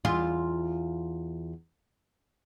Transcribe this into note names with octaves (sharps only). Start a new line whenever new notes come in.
E2 F4